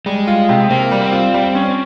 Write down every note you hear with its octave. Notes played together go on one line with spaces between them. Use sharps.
G3 G#3
F4
C3
A#3 C4
G3
C4
F4
G3
C#4